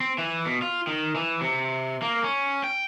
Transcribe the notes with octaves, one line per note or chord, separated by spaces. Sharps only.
C4
E3
B2
F4
D#3
E3
C3
A#3
C#4
G5